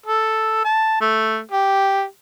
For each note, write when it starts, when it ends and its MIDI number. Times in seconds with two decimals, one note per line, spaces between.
0.06 0.61 69
0.65 0.99 81
1.01 1.40 57
1.51 2.04 67